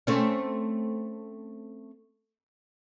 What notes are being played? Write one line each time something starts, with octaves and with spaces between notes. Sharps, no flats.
A3 C4 C#4